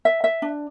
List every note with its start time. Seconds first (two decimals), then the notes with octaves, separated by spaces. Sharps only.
0.05 E5
0.24 E5
0.42 D4